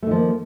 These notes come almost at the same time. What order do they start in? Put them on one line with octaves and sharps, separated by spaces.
A3 D#3 F3 A#3